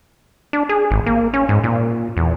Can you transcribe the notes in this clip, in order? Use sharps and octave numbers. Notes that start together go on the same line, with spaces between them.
D4
G#4
G#1
A#3
C#4
G#2
A#2
E2